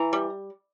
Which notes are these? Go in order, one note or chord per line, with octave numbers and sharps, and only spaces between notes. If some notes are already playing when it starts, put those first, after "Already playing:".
Already playing: E3 A#5
G3